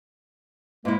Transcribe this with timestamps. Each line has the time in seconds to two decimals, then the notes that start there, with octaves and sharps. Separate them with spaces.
0.85 G#2 E3 G#3 A#3 E4